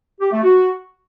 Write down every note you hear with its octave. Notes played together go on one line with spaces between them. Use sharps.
G4
A3
F#4